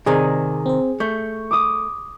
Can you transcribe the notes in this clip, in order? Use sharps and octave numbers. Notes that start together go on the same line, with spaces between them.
C3 D#3 G#4 C5 D5
C4 C5
A3 C#6 G6
D6 D#6